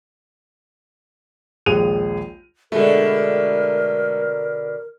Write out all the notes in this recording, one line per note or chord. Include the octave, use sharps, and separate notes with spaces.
A#1 D#2 G#3 G#4 D#7 F7
B2 D3 G#3 A3 A#4